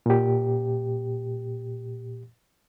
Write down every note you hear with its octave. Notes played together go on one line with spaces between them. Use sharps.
A#2 G4